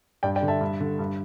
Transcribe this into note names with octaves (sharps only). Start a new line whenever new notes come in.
G2 D5 G5
D5 G5
D3
E5 A5
G2
D3
G2